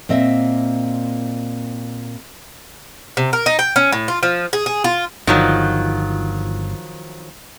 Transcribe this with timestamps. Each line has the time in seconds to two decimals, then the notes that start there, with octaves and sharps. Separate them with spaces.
0.09 A#2 C4 D#5 E5
3.17 C3
3.33 A#4
3.46 D#4
3.59 G5
3.76 C#4
3.92 A2
4.08 F4
4.23 F3
4.53 G#4
4.66 G#4
4.84 F4
5.27 G1 D#3 F3 F#3